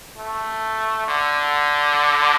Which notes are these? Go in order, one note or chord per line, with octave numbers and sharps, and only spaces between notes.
A3
D3